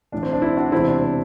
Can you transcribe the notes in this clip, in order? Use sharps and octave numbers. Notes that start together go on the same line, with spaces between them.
B1 A2 E3 D4
C4
D4
C4 E4
D4 F#4
E1 E2 C3 C4 E4
D4
C4